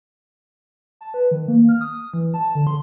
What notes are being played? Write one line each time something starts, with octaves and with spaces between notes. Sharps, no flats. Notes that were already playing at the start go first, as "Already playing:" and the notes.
A5
B4
D#3
A#3
F6
D#6
E3
A5
D3
C6